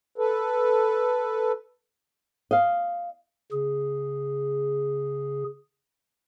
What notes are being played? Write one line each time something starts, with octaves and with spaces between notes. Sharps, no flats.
A4 B4
D#5 F5
C#3 G#4